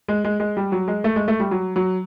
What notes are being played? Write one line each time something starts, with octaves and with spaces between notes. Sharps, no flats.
G#3
G#3
G#3
G3
F#3
G#3
A3
G#3
A3
G3
F#3
F#3